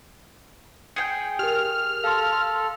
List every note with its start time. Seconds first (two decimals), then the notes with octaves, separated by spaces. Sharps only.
0.96 G#4 G5 G6 C#7
1.39 G4 A#4 F6
2.04 A4 F5 C6